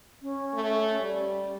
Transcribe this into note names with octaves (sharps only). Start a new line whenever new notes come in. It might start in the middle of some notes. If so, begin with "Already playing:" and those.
C#4
A3
G3